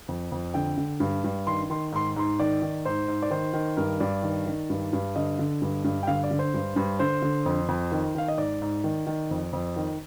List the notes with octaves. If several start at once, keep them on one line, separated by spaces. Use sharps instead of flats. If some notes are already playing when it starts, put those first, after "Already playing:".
F2
F2
D3 G5
D3
G2
G2
D#3 C6
D#3 C6
G#2 C6
G#2 C6
D#3 D5
D#3
G#2 C5
G#2
D5
D#3 C5
D#3
G2 A#4
G2 D5
D#3
D#3
G2
G2
D3 D#5
D3
G2
G2
G5
D3 F5
D5
D3
C5
G2
G2
D3 C5
D3
F2
F2
D#3
D#3 F5
D#5
G#2 D5
G#2
D#3
D#3
F2
F2
D#3